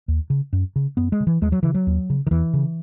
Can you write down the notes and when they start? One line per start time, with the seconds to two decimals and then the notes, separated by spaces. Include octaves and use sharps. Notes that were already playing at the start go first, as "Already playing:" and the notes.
0.08 D#2
0.30 C#3
0.53 F#2
0.76 C#3
0.97 F#2 B3
1.12 G#3
1.20 C#3
1.27 E3
1.41 D#2 G#3
1.52 F#3
1.63 C#3 E3
1.74 F#3
1.87 D#2
2.10 C#3
2.27 D#3
2.31 E2 E3
2.54 C#3